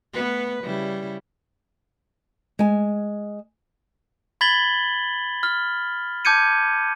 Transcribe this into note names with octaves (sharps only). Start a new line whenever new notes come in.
A3 B3 B4
C#3 G3 E4
G#3 G#5
B5 G#6 A6 B6 F#7 G7
F6
A5 D6 G6 G#6 C#7 D#7